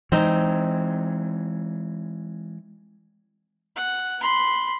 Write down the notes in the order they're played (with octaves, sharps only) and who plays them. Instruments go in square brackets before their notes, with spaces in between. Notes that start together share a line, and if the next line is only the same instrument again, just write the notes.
[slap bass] E3 G#3 [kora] C4 D#4
[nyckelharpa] F#5
B5 C6